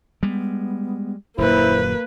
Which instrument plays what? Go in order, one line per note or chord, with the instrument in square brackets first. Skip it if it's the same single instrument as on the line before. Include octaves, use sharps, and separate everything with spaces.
[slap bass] G3 G#3 [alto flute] B3
[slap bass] D#1 F#2 A#2 [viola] A#3 B4 [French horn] E4 [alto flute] C5